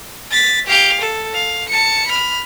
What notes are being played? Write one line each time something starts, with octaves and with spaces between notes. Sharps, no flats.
A6 B6
G4 F5
A4
F5
A5 C#7
B5 F6